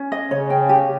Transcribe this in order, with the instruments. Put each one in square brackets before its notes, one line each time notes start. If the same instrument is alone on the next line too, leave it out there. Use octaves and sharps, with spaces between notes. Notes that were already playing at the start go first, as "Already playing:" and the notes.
Already playing: [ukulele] C#4
D#5
[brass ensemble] C#3 [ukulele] C#5
[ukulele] G5
G4